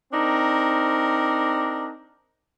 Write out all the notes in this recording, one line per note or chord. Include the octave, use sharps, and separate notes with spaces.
C4 D4 D#4 A#4